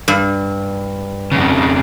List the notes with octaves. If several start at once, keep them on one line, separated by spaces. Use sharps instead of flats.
G2
F2 C#3